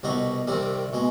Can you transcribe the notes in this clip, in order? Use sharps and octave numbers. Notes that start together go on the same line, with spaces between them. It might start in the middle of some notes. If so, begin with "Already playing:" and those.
C2 B2 B3 D#4
C2 C3 D#3 G3
B2 G#3